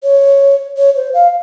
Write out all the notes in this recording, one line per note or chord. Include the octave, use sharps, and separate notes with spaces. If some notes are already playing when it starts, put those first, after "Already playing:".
C#5
C#5
C5
F5